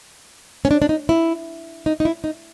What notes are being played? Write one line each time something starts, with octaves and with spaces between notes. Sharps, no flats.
C#4
D4
D4
D#4
E4
D#4
D#4
E4
D#4